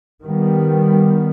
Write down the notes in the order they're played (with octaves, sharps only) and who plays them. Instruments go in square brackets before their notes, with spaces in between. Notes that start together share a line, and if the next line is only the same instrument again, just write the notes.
[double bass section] D#3 G3 B3